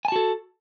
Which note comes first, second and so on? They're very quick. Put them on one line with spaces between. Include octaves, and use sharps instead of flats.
G#5 A5 F#4 A4